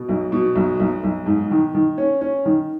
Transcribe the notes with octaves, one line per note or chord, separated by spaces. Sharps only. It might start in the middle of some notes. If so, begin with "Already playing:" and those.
Already playing: B2
B1
B2
B1
B1
B1
G#2
D#3
D#3
C#4
C#4
D#3